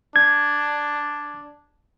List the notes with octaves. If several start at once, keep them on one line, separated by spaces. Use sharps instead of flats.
D4 G#6